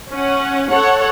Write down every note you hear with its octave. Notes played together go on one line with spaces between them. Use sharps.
C#4 F#5
A4 C#5 F#5